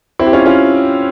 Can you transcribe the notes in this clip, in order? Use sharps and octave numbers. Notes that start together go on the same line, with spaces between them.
C4 E4
G4
C#4 F4
C#4 F4